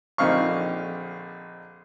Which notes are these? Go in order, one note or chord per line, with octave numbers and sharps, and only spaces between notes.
A#1 D3 C4 D#4 F5 C#6